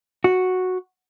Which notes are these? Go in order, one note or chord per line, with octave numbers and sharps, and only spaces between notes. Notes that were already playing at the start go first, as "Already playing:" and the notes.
F#4